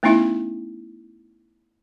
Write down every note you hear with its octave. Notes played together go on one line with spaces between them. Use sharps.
A3 B3 C#4 D#4 E4 E5